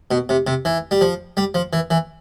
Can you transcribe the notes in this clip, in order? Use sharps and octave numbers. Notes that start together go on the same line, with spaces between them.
B2
C3
C3
E3
G3
F3
G3
F3
E3
E3